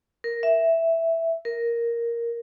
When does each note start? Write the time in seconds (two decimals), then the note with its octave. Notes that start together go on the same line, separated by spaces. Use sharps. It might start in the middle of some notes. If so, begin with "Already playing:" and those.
0.24 A#4
0.43 E5
1.45 A#4